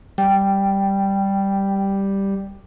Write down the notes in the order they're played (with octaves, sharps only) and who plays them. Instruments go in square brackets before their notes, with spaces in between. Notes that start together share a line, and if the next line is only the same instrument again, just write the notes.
[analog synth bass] G3 [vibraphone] G5